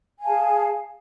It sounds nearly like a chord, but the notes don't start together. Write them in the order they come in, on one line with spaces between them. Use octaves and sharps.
G#5 F5 A5 G#4